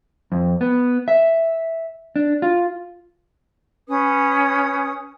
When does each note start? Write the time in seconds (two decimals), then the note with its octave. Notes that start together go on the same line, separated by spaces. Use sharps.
0.32 F2
0.61 B3
1.08 E5
2.16 D4
2.42 F4
3.87 C#4 B4 D#6